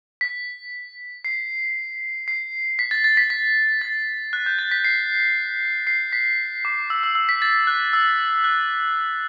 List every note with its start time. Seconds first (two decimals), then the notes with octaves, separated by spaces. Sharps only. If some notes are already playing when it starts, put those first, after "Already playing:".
0.21 B6
1.25 C7
2.28 C7
2.79 B6
2.91 A6
3.04 A6
3.17 B6
3.30 B6
3.81 A6
4.33 F#6
4.46 G6
4.59 A6
4.71 B6
4.84 C7
5.87 C7
6.13 B6
6.65 D6
6.90 E6
7.03 E6
7.15 E6
7.29 B6
7.42 A6
7.67 F#6
7.93 E6
8.44 F#6